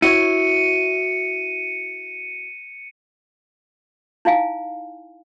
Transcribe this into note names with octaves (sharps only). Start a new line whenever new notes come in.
E4 F#4 C#5 C#7 D#7
D#4 E4 F5 G#5